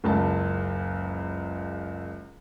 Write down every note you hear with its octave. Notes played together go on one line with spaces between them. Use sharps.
F#1 C#2 A5